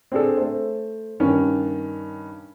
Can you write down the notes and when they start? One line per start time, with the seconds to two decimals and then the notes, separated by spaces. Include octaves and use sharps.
0.12 C4 D4 G#4 A4
0.37 A3 C5
1.20 G2 D#3 C#4